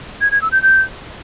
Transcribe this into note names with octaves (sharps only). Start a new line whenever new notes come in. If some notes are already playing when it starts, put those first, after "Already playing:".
G#6
G#6
E6
G6
G6